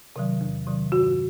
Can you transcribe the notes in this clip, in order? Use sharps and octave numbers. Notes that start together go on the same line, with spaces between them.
C3 D#3 F#3
E2
C3 D#3 F#3
G2 F#4